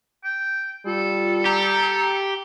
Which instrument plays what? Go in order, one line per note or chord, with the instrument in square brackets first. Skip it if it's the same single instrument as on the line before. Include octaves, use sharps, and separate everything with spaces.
[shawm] G5
[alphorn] G3 [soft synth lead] F4 [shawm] A4
[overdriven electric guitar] G4 [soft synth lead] A#5